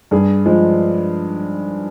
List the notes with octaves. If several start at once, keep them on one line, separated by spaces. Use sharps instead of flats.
G2 G#4
F3 G#3